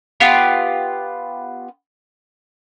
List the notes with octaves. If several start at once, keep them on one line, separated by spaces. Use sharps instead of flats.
B3 F4 G4